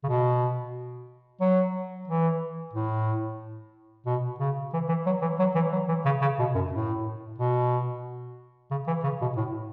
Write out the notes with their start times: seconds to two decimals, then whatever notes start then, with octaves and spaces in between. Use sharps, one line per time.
0.04 C#3
0.09 B2
1.41 F#3
2.08 E3
2.73 A2
4.06 B2
4.39 C#3
4.73 E3
4.89 E3
5.06 F#3
5.22 E3
5.39 F#3
5.55 E3
5.72 F#3
5.88 E3
6.05 C#3
6.22 C#3
6.39 B2
6.55 F#2
6.72 A2
7.38 B2
8.71 C#3
8.87 E3
9.04 C#3
9.21 B2
9.37 A2